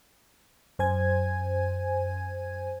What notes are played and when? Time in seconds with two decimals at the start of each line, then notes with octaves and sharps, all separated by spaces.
0.79 F#2 C5 G#5 G#6